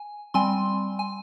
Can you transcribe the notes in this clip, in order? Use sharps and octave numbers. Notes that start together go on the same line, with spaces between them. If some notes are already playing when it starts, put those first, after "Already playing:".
Already playing: G#5
G3 C4 G#5 C6
G#5